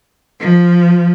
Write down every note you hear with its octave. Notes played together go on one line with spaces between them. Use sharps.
F3